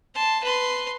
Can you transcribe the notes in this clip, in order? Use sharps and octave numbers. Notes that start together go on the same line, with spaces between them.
A5 C6
B4 C6